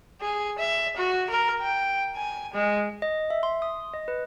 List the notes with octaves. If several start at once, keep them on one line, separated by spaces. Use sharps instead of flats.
G#4
E5
F#4
A#4
G5
G#5
G#3
D#5
E5
C6
D#6
D#5
B4